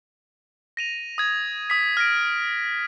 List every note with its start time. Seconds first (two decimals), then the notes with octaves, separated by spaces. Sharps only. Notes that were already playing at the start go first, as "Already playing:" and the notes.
0.77 A#6 D#7 F7
1.18 D#6 G#6
1.70 D#6 B6
1.97 F6 A#6 D7